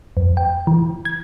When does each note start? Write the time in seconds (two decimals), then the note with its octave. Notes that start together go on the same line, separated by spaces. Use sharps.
0.17 F2
0.37 G5
0.67 E3
1.05 G#6